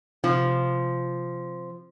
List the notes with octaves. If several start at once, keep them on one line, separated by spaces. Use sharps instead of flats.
C3 F3